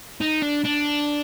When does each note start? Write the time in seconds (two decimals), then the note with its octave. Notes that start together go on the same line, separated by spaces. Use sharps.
0.21 D#4
0.42 D4
0.64 D4